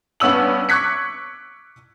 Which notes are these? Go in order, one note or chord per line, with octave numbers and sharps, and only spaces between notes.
G2 B3 C#4 E6 F#7
C#6 D6 F#6 G#6 B6 C#7